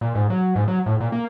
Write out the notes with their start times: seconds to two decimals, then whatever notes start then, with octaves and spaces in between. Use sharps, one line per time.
0.01 A#2
0.15 G#2
0.30 F#3
0.56 G#2
0.68 F#3
0.86 A2
1.00 A#2
1.12 A#3